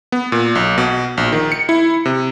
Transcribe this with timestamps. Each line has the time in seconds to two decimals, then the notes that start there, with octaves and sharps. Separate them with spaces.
0.12 B3
0.32 A#2
0.55 B1
0.78 B2
1.17 A#1
1.32 D#3
1.52 C#7
1.69 E4
2.05 C3